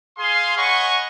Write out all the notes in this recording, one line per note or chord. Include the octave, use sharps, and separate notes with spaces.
G#4 F5 G#5 C6
C#5 D#5 F#5 G#5 B5 C#6